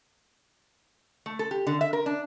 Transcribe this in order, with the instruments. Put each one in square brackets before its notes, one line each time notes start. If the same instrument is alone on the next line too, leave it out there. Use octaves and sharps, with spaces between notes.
[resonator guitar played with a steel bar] A3
A4
G4
D3
E5
A#4
D4